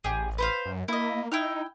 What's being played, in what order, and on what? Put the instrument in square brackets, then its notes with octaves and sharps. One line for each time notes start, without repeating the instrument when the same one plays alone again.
[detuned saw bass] A1 [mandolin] G4 G#4
[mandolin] B4 C5 F5
[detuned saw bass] F#2
[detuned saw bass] A#3 [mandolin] E4 D#5
[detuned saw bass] D#4 [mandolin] E4 G5 F6